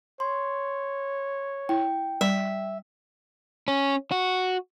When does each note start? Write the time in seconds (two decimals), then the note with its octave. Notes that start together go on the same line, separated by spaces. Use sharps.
0.20 C#5 C6
1.69 E4 G5
2.21 G3 E5
3.68 C#4
4.11 F#4